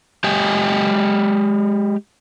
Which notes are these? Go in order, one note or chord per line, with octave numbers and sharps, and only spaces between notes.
G#3 G4 D#5 G5 G#5